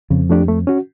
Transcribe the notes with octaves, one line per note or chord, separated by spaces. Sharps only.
F2 C#3
F3 A3 D4 G4
A3
C#4 F#4